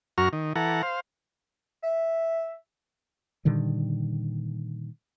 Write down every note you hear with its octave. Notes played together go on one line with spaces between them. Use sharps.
F#2 F#4 A#5 C#6 F6
D#3
E3 A4 F#5 A#5
C5 F5
E5
A#2 D3 D#3 G3